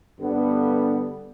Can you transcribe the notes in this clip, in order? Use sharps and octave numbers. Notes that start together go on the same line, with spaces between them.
G2 D3 G3 B3